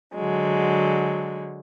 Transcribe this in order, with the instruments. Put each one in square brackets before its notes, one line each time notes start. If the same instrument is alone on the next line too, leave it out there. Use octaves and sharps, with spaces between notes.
[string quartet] D3 F#3 G#3